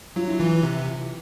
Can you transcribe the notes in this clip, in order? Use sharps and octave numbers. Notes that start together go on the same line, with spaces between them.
F#3 F4
E4
E3 F4
C3